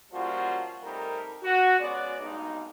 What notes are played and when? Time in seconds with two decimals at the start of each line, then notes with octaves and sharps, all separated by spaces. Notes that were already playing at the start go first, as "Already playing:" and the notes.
0.12 F3 G3 A#3 C#4 F4 F#4
0.82 G3 A3 C4 D#4 A#4
1.42 F#4
1.79 C#3 G#3 B3 C#5 D5
2.20 G2 B2 G#3 A#3 D#4